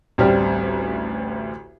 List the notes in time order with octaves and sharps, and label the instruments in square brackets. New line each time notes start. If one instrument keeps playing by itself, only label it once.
[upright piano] A1 D2 G3 C4 G4 F6